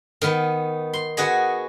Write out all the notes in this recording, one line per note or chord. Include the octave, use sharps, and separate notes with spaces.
D#3 B3
C6
B3 F#4 G#4 D#5